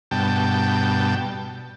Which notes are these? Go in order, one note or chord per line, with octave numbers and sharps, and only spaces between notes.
G2 B2 G5 A5